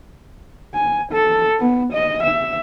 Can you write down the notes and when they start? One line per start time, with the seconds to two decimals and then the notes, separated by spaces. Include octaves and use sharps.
0.74 G#5
1.12 A4
1.60 B3
1.93 D#5
2.23 E5